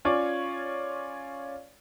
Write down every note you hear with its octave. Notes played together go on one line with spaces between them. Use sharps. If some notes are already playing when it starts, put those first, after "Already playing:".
C#4 F4 C#5 D5